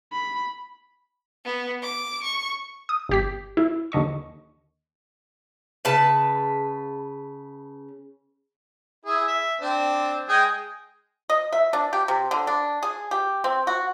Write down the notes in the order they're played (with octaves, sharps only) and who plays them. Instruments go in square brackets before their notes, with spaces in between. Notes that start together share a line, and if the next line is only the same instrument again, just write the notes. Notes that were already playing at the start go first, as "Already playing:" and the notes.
[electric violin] B5
[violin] B3
D6
C#6
[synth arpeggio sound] D#6
G1 G4 B6
E4
D#2 D3 D#5 C#6
[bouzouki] C#3 B4 A5
[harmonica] E4 G#4
E5
C4 D4
G#3 G#4 G5
[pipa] D#5
E5
D4
G4
C3
D3
D4
G#4
G4
C4
F#4